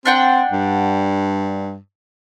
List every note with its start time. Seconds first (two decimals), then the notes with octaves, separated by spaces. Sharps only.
0.06 C4 D4 F#5 G5
0.52 G2